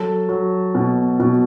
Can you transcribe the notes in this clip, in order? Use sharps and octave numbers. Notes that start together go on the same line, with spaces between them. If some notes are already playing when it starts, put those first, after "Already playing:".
Already playing: F#3 A4 A5
F#3
B2
B2